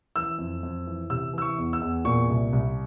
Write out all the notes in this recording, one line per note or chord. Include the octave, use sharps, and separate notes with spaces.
E3 E6
F2
F2
E3
C3 E6
E3 E6
C#6
E2
E6
E2
A#2 C#6
C2
C2